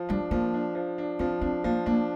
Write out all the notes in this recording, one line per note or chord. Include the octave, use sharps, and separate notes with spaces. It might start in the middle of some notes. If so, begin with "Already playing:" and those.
Already playing: F3
G3 D4
F3 A#3
D4
F3
D4
F3 C4
C4 D4
F3 A#3
A#3 D4